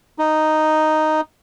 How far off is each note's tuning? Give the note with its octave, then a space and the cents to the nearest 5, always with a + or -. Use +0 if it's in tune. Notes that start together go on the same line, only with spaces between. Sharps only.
D#4 -5